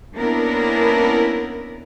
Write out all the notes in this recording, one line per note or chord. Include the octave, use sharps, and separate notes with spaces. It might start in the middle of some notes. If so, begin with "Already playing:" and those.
A#3 B3 C#4 D4 E4 A#4